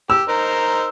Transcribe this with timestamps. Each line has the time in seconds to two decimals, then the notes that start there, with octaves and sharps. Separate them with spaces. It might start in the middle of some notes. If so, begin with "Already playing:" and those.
0.10 G4 E6
0.29 D#4 A#4 C5